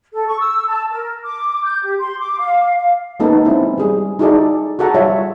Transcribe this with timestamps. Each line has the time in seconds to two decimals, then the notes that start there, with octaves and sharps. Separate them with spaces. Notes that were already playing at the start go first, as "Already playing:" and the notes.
0.12 A4
0.26 C#6
0.39 E6
0.67 A5
0.90 A#4
1.24 D6
1.63 G6
1.82 G4
1.99 C6
2.19 D6
2.39 F5
2.76 F5
3.20 G#3 A#3 B3 C#4 D#4 A4
3.45 G#3 C4 C#4 E4
3.78 G3 G#4
4.19 D#4 E4 F#4 G#4 A4 D5
4.79 F#4 G#4 A4 F#5 A#5
4.94 G3 F4 C#5 E5